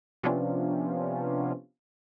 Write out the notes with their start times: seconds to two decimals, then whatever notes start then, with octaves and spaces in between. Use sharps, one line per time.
0.23 C3 F3 B3 C#4 D4 F4